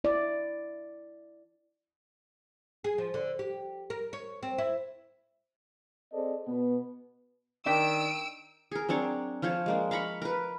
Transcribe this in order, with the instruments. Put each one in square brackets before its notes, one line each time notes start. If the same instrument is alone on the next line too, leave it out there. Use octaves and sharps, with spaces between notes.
[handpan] E4 D5
[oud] G#4
F3
D3
G4
A#4
C#5
C4
E4
[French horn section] C4 G#4 A4 C5 D5 D#5
B2 B3
[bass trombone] D#3 [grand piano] D4 D6 B6 [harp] G5 [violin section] E6 D7
[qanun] G#4 A#4
F#3 C4 D4 C#5
F3 F4 C5 C#5
G#3 A#3 D4
F5 A#5 B5 C#6
A#4 B4